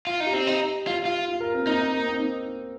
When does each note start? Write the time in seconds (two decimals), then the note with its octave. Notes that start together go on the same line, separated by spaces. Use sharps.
0.07 F4
0.20 D#4
0.26 G4
0.33 C4
0.47 D#4
0.87 F4
1.05 F4
1.28 F4
1.40 A#4
1.54 C4
1.67 A#3 D#4
1.80 C4
1.93 A#3
2.07 C4